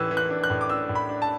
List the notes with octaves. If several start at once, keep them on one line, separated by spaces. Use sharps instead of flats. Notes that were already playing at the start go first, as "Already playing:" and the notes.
Already playing: A2 E3 E6 F#6
E3
F#6
D4
F#6
A2
D6
D4 E6
A2
B5
D4
A5